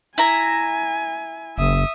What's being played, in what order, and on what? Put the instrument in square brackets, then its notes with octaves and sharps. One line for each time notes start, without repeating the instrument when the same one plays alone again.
[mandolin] E4 A#5 [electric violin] G#5
[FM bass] F#1 [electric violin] E5 D#6